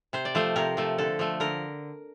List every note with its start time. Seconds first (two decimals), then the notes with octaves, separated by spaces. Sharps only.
0.13 C3 C5
0.25 D5
0.35 F3 A3 C5
0.56 C3 A#4
0.77 F3 A3
0.98 D3 A4
1.19 F3 A3
1.40 D3 A#4